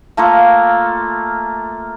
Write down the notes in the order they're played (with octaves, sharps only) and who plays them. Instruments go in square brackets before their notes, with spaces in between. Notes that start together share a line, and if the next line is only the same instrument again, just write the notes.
[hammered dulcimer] A3 A#3 F4 A4